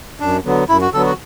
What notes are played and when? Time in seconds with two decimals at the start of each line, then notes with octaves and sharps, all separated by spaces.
0.20 F#2 D4
0.44 D3 F#3 B3
0.68 F#2 E4
0.81 F#4
0.93 D3 F#3 B3 A4
1.05 F#4